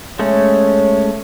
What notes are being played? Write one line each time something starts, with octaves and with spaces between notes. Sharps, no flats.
G#3 A3 C#4 C#5